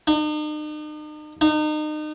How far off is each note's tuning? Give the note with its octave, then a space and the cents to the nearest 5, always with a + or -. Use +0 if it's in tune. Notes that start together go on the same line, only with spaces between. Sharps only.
D#4 -45
D#4 -35